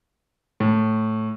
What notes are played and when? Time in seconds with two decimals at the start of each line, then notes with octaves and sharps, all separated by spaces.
0.60 A2